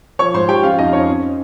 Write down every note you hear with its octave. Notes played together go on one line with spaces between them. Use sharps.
F3 C#5 C#6
G#2 C5 C6
F3 G4 G5
C#4 F4 F5
F2 D#4 D#5
C#4 C#5
C4
C4